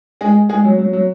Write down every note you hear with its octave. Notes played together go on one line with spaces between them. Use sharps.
G#3 G#4
G#3 G#4
F#3
F#3
F#3